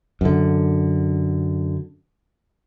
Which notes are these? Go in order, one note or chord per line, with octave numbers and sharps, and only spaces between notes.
F#2 D3